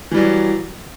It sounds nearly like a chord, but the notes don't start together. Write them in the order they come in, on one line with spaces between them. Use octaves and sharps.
E3 G3 F#3